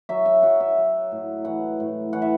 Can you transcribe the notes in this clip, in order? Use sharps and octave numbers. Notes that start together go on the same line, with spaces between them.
F#3 E5
E5
F#3 F#5
E5
F#3
A2
E3 F#5
A2
E3 F#5
E5